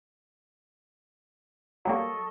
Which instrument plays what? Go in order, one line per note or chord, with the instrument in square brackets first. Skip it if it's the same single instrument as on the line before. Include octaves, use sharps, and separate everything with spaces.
[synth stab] F#3 G3 A#3 [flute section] A4 D#5 C#6